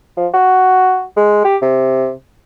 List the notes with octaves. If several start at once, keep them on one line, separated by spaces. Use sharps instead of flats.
F3
F#4
G#3
G4
C3